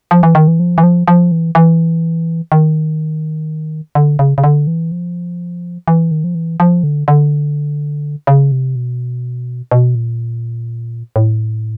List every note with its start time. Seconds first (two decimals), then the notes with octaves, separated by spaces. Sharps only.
0.11 F3
0.23 E3
0.35 D#3
0.48 E3
0.60 F3
0.78 E3
0.83 F3
1.08 F3
1.32 E3
1.55 E3
2.52 D#3
3.95 D3
4.19 C#3
4.38 C#3
4.44 D3
4.67 E3
4.92 F3
5.88 E3
6.11 D#3
6.24 F3
6.35 E3
6.60 F3
6.84 D3
7.08 D3
8.27 C#3
8.52 C3
8.76 B2
9.71 B2
9.95 A#2
11.16 A2